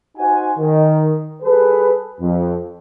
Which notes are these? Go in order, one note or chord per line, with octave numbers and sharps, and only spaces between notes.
D#4 F#4 C5 F#5 G#5
D#3
G3 G#4 A4 B4
F2